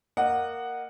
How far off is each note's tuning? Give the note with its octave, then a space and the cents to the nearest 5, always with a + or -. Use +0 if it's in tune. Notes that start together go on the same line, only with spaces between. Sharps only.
A#3 +0 D#5 -25 F#5 +0